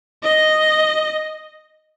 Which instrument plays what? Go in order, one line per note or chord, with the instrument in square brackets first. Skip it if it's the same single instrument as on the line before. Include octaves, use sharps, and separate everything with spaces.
[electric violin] D#5